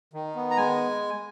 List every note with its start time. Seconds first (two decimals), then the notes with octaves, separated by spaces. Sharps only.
0.14 D#3
0.36 B3
0.51 A#5
0.57 G#3 G#5